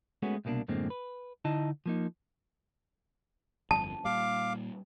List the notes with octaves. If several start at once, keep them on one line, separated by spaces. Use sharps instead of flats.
G#3 A3 B3 C#4 F#4
C2 B2 A#3 C#4 D4
F#2 A2 D3 G#3 A#3 C4
B4
D3 D#4 E4 D#5 A5
F3 A#3 D#4
G1 F2 A5
A#2 G3 F5 D6